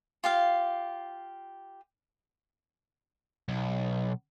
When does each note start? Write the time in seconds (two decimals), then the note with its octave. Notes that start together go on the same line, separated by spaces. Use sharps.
0.24 F4 G4 F5
3.48 B1